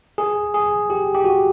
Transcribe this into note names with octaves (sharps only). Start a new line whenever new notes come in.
G#4
G#4
G4
G4
F#4